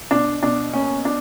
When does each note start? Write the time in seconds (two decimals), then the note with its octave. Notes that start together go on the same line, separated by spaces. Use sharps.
0.11 B2 D4
0.42 B2 D4
0.74 A#3 C#4
1.05 D4